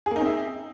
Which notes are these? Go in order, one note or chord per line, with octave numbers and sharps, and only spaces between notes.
A#3 C4 D#4 G#4 E5